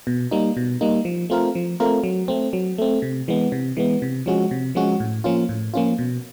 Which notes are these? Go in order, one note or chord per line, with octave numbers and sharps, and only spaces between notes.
B2
G3 A#3 D#4
B2
G3 A#3 D#4
F3
A3 C4 F4 A#4
F3
A3 C4 F4 A#4
F#3
A3 C4
F#3
A3 C4
C3
E3 G#3 B3
C3
E3 G#3 B3
C3
F3 G#3 C#4 F#4
C3
F3 G#3 C#4 F#4
A2
F3 A#3 C#4 F4
A2
F3 A#3 C#4 F4
B2